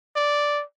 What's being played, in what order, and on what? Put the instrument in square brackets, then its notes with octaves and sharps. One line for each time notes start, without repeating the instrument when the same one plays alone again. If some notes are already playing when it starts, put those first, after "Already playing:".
[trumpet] D5